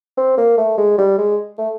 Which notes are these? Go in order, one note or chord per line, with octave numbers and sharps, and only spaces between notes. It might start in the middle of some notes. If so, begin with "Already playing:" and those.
C4
A#3
A3
G#3
G3
G#3
A3